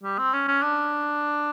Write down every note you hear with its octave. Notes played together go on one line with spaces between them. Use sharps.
G3
C4
C#4
C#4
D4